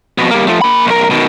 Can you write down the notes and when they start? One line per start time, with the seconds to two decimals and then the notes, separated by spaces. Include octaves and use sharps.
0.18 F2 B2
0.31 G3 A#3
0.47 F3 A3
0.61 A#3 B5
0.87 B1 A#4
1.10 B2 D#3